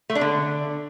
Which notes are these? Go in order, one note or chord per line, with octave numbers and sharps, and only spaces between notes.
A3
D4
D3